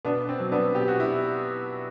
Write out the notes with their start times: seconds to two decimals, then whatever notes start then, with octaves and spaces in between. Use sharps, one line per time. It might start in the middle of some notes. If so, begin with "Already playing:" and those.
0.05 B2 B3 D4
0.29 C4
0.40 F#3
0.52 B3 D4
0.75 B2 G4
0.88 F#4
1.00 E4